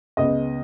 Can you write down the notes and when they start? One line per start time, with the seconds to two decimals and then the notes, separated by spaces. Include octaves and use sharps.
0.17 C#2 C#3 B3 D#5